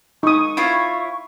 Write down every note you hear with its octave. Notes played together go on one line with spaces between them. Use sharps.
D#4 C#6 D#6
E4 F4 C#5